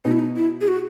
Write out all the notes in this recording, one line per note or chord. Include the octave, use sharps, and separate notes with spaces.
B2 D#4
E4
D#4
E4
G#4
F#4